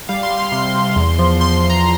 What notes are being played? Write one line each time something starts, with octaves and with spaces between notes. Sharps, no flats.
G3 F5
C6
G3
C6
C3 C6
C3
E2
F3
F3 C6
C6
E2
A#5